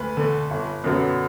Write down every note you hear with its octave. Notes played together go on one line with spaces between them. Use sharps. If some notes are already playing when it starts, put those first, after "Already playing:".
Already playing: D2 B4
D3 A3
G1
F#2 D3 F#3 B3